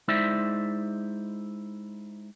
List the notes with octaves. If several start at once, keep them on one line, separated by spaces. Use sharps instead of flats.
G#3 D#4 E4 C5 D5 E5